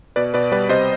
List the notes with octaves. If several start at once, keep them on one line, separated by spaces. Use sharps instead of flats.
B2 B4 D5
B2 B4 D5
G3 B4 D5
C3 C5 D#5